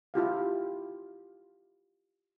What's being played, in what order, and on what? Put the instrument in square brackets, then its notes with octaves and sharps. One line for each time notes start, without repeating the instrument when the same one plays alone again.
[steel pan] E4 F4 G4 F5